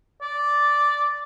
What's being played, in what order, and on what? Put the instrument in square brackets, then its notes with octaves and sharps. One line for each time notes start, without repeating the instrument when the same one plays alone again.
[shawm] D5